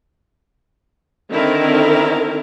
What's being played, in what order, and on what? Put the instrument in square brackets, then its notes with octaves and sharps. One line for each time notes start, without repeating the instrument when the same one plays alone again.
[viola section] D3 D#3 C4 E4 A4 A#4